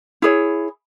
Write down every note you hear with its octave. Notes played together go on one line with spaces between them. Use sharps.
E4 G#4 C#5